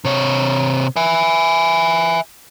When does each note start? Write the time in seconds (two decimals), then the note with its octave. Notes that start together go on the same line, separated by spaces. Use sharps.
0.05 C3 C#5
0.96 E5 G#5